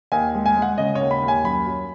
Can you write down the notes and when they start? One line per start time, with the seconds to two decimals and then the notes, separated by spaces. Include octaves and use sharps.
0.12 D#2 G#5
0.35 G#3
0.46 G#5
0.57 G#3
0.62 F#5
0.78 C#3 D#5
0.95 D#2 C#5
1.11 B5
1.22 D#2
1.28 G#5
1.44 F#2 B5
1.66 F#3